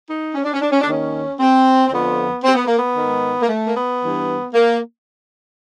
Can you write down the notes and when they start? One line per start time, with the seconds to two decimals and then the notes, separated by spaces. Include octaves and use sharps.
0.08 D#4
0.34 C#4
0.43 D4
0.53 C#4
0.62 D4
0.71 C#4
0.82 D4
0.87 D#2 D#3 C#4
1.40 C4
1.88 C4
1.91 F2 D3 F3 B3
2.44 C4
2.55 B3
2.66 A#3
2.77 B3
2.96 G#2 D#3
3.41 A#3
3.49 A3
3.66 A#3
3.75 B3
4.01 G2 E3
4.54 A#3